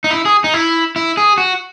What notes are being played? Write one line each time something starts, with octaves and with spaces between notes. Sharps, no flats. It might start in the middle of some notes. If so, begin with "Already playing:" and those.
D#4
E4
G#4
D#4
E4
E4
G#4
F#4